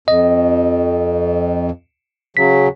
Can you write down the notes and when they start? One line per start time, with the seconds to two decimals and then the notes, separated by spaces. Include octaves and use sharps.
0.08 F2 D#5
2.37 C#3 F#3 B6